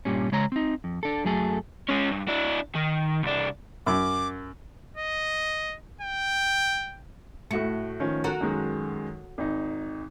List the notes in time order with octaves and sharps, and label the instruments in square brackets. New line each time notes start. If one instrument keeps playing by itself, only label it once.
[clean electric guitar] G2 A#2 G3 C#4
C#3 G#3 C#5 A#5
C4 D#4
F2
D4 A4
F#2 F#3 A3 G#4 A4
[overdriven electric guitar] G#3 C#4
G2
D4 E4
D#3
C2 D4
[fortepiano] F#2 [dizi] D6
[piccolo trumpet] D#5
G5
[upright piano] A2 F#4 C#7 [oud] A3
[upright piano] D#3 F3 C#4
[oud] F#4 A4 A#4
[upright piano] F#2 D#3 G#3
G#1 D#4